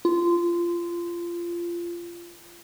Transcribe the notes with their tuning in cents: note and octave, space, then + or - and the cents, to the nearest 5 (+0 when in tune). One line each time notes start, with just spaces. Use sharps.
F4 -20